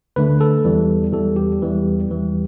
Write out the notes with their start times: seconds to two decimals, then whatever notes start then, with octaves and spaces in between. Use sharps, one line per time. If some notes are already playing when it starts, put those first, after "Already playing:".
0.16 D2 D3 A3 B4
0.41 A4
0.65 E2 E3 G3
1.12 E2 E3 G3 A4
1.36 G4
1.62 E2 E3 G3
2.08 E2 E3 G3